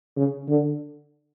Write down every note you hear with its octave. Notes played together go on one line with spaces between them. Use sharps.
C#3
D3